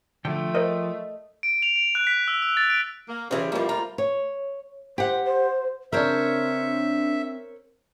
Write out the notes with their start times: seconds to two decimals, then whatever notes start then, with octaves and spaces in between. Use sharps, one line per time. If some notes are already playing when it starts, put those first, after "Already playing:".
0.25 D3 F3 A3 G5
0.55 A#4 C5 D5 D#5
1.43 D7
1.62 F7
1.76 D7
1.95 F#6
2.07 B6
2.28 E6
2.42 E6
2.57 A6
2.70 D7
3.09 A#3
3.31 C#3 E3 G3 G4 C5
3.52 F2 D3 G3 A3 A#3
3.69 F4 A#5
3.98 C#5
4.98 G4 C5 F#5
5.25 C5
5.92 C#3 C4 D4 A#4 C5 C#5 E5